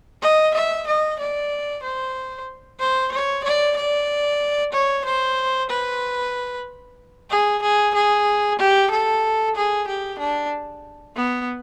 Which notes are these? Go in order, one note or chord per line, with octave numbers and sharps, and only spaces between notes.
D#5
E5
D#5
D5
C5
C5
C#5
D5
D5
C#5
C5
B4
G#4
G#4
G#4
G4
A4
G#4
G4
D4
B3